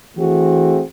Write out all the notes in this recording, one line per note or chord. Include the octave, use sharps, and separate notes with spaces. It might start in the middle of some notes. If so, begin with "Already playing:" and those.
E3 A3 C4 F#4 G#4